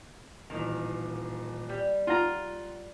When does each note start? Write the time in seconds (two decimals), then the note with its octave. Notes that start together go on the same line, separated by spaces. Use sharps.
0.50 D#1 A1 D#3
1.69 G3
2.07 F4 F#5 A#5